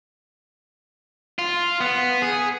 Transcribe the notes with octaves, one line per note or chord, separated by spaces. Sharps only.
F4
B3
G#4